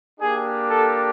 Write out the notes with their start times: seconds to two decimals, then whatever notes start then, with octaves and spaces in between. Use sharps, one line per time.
0.20 A#3 D4 G4 G#4
0.70 A4